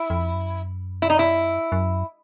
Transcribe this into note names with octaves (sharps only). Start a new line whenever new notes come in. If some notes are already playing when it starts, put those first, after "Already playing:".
Already playing: E4
F2
F#2
E4
D#4
E4
F#2